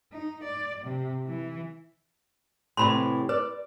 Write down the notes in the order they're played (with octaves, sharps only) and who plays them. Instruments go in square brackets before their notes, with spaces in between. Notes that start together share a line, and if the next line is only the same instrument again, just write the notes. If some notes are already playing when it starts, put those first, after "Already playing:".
[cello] D#4
D5
C3
E3
[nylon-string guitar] A2 C3 E3 [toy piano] D5 B5 C6
[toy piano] B4 [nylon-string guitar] D5